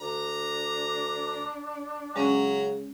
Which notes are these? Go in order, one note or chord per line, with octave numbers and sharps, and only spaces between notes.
D2 D4 A#5
C#3 F#3 G#3 C#4 F#4 A#5